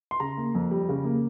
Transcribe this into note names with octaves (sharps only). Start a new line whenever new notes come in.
C6
C#3 A#5
A#3
F2
G3
C#3
A#3